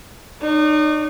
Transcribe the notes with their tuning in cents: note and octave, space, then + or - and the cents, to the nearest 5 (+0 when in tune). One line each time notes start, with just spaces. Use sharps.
D#4 -35 C#5 +45